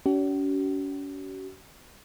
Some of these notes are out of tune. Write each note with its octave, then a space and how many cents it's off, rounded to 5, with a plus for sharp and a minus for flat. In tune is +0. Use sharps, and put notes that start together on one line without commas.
C#4 +40 F#4 +45